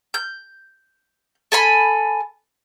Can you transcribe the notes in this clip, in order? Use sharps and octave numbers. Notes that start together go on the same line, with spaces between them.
G6
A4 G#5 B5